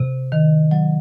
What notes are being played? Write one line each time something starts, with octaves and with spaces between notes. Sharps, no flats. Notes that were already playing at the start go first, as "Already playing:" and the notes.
Already playing: C3
D#3
F#3